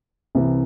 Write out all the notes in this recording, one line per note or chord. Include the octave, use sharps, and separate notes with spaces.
C2 C3 E3